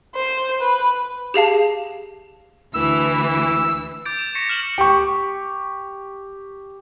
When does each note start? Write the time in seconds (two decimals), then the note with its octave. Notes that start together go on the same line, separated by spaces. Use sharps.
0.15 C5
0.61 B4
1.34 G4 G#4 F5 A5
2.74 D2 E3 E4 E6
4.05 D6 G6 A6 D7
4.19 E7
4.35 C#6 A#6 B6 C#7
4.49 F6 E7 F#7 G7
4.78 G4 C#6